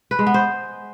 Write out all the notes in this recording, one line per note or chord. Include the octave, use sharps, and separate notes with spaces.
B4
G#3
B3
C5